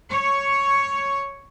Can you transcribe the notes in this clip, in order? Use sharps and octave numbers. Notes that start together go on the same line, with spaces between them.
C#5